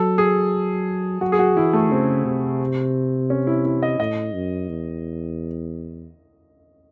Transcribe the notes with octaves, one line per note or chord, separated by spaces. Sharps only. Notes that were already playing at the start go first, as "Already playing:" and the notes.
Already playing: F#3 A4
G#4
F#3 F#4
G#4
F#4
E3 E4
A3
C#3 C4
C3
C#4
E4
E4
D#5
A2 D#5
F#2
E2